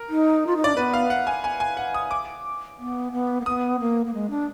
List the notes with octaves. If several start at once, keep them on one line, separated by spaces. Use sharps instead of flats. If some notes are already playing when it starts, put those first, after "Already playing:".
Already playing: A#4
D#4
F4
D#4
D4 D5
B3 B4
F5
F#5
G#5
G#5
G#5
F#5
D#6
D6
B3
B3
A#3
B3 D#6
A#3
A#3
G#3
D4